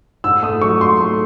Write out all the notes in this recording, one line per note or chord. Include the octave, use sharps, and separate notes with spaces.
G#2 E6
A3 D#6
F#3 C#6
G#2 C6
A3